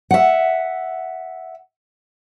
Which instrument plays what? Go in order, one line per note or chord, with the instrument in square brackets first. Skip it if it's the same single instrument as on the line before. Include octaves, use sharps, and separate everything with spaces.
[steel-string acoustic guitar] E5 F#5